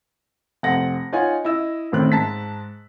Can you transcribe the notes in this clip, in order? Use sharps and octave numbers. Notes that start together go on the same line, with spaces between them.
F1 C4 F#5 A#6
D#4 F4 C#5 D#5 F#5 G#5
E4 D#5 E6
A1 A2 D#3 C4 F#6
G#2 A5 A#5 B6